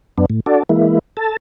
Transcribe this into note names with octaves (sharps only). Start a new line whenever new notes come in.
F#2 B3 D4
A2
D4 F#4 A4 D5
E3 G#3 A#3 E4
A4 A5